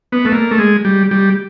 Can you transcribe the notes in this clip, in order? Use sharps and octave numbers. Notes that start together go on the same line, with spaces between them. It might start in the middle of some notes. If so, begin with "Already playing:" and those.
B3
A3
A#3
A3
G#3
G3
G3